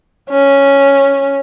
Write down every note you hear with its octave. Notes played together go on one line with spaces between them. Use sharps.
C#4